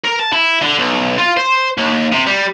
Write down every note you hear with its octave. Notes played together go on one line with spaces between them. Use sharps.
A#4
A5
E4
D3
B1
F4
C5
D#2
C3
G3